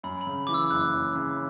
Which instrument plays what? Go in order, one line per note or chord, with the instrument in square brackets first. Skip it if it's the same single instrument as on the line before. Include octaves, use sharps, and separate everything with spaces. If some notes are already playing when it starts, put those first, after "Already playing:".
[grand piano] F#2 [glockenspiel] B5
[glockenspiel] B5
[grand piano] C#3
[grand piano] E3 [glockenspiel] D6
[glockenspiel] E6
[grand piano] F#1 [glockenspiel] F#6
[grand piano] F#2
C#3